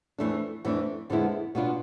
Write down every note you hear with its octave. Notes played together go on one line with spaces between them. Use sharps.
F2 E3 A3 D4
F2 E3 A3 D4
F2 D3 G#3 B3 E4
B2 B3 D4 F4